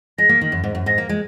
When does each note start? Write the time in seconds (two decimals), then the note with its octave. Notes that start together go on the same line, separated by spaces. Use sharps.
0.18 G#3 A#6
0.29 A#3
0.41 D#3
0.52 F#2
0.64 G#2
0.75 F#2
0.86 G#2 A#6
0.98 A#3
1.09 G#3